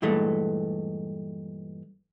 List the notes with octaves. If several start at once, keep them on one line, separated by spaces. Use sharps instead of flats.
G2 A#2 E3 G#3 A3